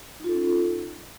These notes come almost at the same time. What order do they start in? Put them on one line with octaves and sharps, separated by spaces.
D#4 F4 A4 C#4